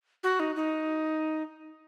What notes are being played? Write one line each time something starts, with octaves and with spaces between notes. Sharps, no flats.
F#4
D#4
D#4